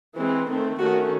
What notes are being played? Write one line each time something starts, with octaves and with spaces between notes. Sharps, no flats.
E3 G#3 C4
D#3 A3 C4
D#3 A3 C#4 F#4